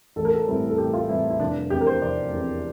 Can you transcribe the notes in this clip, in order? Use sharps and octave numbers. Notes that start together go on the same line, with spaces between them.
A1 A4
A#4
A4
A2 E3 G3 C4
A4
A1 G4
F4
A2 E3 G3 C4 E4
E4
F1 D4
E2 C3 G4
A#4
C5
F1 D5
E2 C3